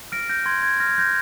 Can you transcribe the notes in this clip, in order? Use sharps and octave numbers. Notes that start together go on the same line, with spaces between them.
F6 A#6 D7
G6 A#6
C6 G#6
G#6
F6 A#6
G#6
G6 A#6